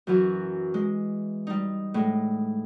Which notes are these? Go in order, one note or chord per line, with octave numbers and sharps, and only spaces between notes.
F#2 E3 F#3
G#3
G3 D#4
A2 G#3